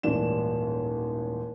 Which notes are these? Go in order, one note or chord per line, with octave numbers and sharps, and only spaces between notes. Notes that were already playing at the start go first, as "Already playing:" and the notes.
D#1 A1 G#2 D5 E7